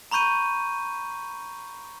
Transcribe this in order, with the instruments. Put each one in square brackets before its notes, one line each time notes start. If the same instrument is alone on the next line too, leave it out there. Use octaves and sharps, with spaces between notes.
[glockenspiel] A#5 B5 C#6 G6 D#7